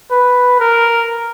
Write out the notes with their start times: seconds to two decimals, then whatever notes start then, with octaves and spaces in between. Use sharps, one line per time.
0.11 B4
0.60 A#4